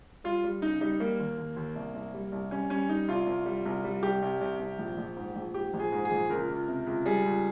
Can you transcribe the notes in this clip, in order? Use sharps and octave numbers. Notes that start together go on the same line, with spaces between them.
G3 F4
G3
C#3 D#4
G3 D#4
G3 A#3
D#2
D#2
D#2
C2
C2
G3
C2
G3 C#4
G3 C#4
G3 D#4
C2 F4
C2
G3
C2
G3
C2 G4
C2
C2
C2
A#1
A#1
G#2
A#1
G#2 G4
A#1
G#4
G#2
G#4
A#1
C#2 A#4
C#2
C3
C#2
G3 G#4
C#2